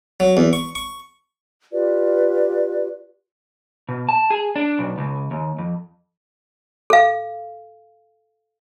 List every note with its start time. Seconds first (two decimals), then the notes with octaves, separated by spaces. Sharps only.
0.20 F#3
0.37 E2
0.53 C#6
0.75 C#6
1.73 F4 G4 B4 D5
3.89 B2
4.09 A5
4.30 G#4
4.56 D4
4.79 B1
4.98 C#2
5.31 D#2
5.58 F2
6.90 A4 F5